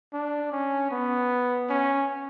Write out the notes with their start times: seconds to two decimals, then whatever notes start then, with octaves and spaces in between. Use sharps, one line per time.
0.13 D4
0.52 C#4
0.91 B3
1.70 C#4